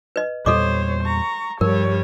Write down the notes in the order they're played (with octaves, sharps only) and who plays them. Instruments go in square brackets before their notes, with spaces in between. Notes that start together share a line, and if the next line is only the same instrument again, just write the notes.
[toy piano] B4 D#5
[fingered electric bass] E2 A#2 G3 [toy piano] A4 D#5 D6 [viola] C5 C#5
[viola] A#5 C#6
[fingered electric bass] G2 F3 [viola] G3 C#5 [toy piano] A#4